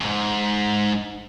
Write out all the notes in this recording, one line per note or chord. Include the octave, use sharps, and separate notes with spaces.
F2 G#2